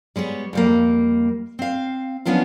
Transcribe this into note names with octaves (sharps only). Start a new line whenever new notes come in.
G3 G#3 B3 C#5
F2 G3 A#3
C4 F5
D#3 F3 B3 C#4 D4 F4